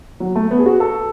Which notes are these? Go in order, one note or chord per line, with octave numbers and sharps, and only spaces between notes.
F#3
A3
B3
G#4
F#4
A4